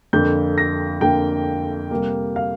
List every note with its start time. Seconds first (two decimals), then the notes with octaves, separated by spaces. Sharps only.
0.13 F2 D3 A#3 G6
0.58 A#6
1.01 F2 D3 A#3 G5
1.91 C3 G3 A#3
2.36 F5